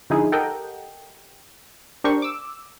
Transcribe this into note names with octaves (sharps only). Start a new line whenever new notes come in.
D3 F3 D#4 E4 G#4
G4 A4 A#4 D#5 F#5 G5
D4 G4 A#4 C5 C#6
D6 E6